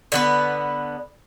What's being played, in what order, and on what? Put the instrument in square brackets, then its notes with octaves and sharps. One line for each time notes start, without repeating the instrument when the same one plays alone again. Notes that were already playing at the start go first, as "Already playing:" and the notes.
[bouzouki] D3 B3 B4